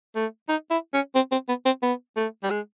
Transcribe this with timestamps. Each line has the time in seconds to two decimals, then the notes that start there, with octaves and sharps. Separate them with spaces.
0.16 A3
0.49 D#4
0.71 E4
0.94 C#4
1.16 C4
1.32 C4
1.48 B3
1.66 C4
1.83 B3
2.17 A3
2.43 G3
2.50 G#3